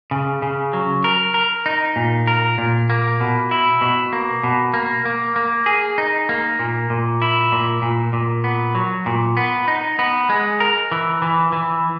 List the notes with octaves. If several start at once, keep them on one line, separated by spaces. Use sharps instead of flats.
C#3
C#3
F#3
A#4
A#4
D#4
A#2
A#4
A#2
A#3
B2
E4
B2
A#3
B2
A#3
A#3
A#3
G#4
D#4
A#3
A#2
A#2
E4
A#2
A#2
A#2
B3
F#3
A#2
B3
D#4
B3
G#3
A#4
E3
E3
E3